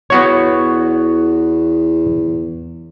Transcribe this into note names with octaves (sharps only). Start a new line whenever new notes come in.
E2 B3 F#4 C#5